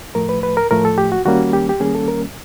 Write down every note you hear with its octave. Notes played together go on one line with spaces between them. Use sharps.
A2 F3 A3 A#4
B4
B4
A#4
A2 F3 A3 A#4
A4
G4
F#4
D#3 G3 A#3 C#4 F#4
G4
G4
D#3 G3 A#3 C#4 G#4
A4
A#4